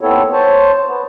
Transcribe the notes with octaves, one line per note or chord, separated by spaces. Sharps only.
D#2 B3 C4 E4 A4 C#5
C5 C#5 A5
B3